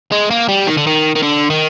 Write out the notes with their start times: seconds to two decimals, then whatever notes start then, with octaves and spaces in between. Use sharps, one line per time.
0.12 G#3
0.30 A#3
0.49 G3
0.67 D#3
0.77 D3
0.87 D#3
1.16 D#3
1.23 D3
1.50 D#3